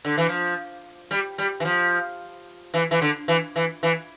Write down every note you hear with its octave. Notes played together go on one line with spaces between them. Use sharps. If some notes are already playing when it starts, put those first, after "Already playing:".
D3
E3
F3
G3
G3
E3
F3
E3
E3
D3
E3
E3
E3